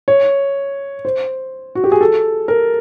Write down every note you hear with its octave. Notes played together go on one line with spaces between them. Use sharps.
C#5
C5
F#4
G4
G#4
A4
A#4